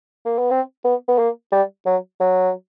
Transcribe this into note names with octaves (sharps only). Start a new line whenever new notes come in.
A#3
B3
C4
B3
B3
A#3
G3
F#3
F#3